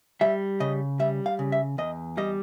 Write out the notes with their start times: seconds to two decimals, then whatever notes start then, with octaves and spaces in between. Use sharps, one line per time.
0.21 G3 E5
0.60 C#3 D#5
0.99 G3 E5
1.26 F5
1.39 C#3
1.52 E5
1.78 E2 D#5
2.17 G3 D#5